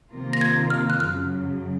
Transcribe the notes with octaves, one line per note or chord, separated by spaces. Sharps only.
C3 D#3 A#3 F4 A#4
A#6
G#6
F6
F#6
F#2 C#3 F#3 F6